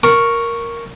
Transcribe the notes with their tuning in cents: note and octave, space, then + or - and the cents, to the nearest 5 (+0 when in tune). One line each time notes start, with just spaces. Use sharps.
A#4 +0 C#6 +0